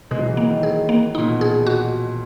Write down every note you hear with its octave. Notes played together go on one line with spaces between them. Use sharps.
B2 G#3
F#3
E3
F#3 A#3
D#3
G#4
A#3
A#2 D#4
B2
G#4
F#4